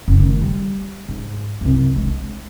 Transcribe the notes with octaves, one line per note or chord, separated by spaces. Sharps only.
F#1 B3
D#3 A3
G3
G#2
C2 F#2
G#3 D4